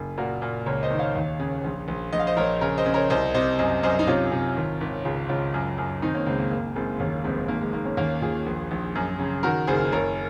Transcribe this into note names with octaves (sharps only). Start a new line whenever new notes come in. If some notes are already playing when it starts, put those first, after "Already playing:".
Already playing: F#1
A#2 F#4 A#4
A#2
C#2 A#4 C#5
C5 D#5
D#3
C#5 F5
D#2
C#3
A#1
A#1
A#1 D#5
F5
C5 D#5
A#1 A#4 C#5
C#3 A#4 C#5
C5 D#5
C#3
A#4 C#5
C2 C5 D#5
C3 C5 D#5
F#2 C5 D#5
F#2 C5 D#5
D#4
C3 C#4 F4
C3
G#1
G#1
C#2 F4 G#4
C#2 C#4 F4
F#2
F#2
D#3 C4 D#4
A#3 C#4
C#2 G#3 C4
A#3
F#1 A#3
F#1 G#3 C4
D#2 A#3 C#4
F1 G#3 C4
G#1 A#3
G#3
D#3 A#3
A#3 C#4
D#2 A#3 C#4
D#2 F4 G#4
A#1
A#1
F#2
C#3
D#3 F#4 A#4
F#1 G#4 C5
F#1 A#4 C#5